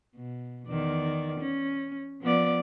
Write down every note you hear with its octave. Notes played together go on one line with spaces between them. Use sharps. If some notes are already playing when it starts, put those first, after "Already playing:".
B2
E2 D#3 D5
C#4
F3 B3 D5